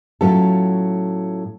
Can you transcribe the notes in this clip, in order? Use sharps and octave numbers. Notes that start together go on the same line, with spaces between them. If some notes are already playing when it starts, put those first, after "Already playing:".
A2 F#3 C#4 F4 A4